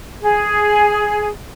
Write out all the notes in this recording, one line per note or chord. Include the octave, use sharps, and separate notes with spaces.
G#4